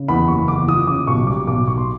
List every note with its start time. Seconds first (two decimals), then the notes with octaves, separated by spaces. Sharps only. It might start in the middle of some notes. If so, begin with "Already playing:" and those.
Already playing: C#3
0.08 E2 B5
0.28 F#1 C#6
0.48 E2 D6
0.68 F3 D#6
0.87 C#3 D6
1.07 B1 C#6
1.27 G3 D6
1.47 B1 D6
1.67 B1 C#6
1.78 C6